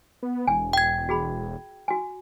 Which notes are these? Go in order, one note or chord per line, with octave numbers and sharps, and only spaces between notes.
B3
E1 G#5
G5 G#6
F#4 G#4 B5
F#4 G#5